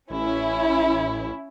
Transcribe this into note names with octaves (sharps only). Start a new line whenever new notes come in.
A1 C#4 E4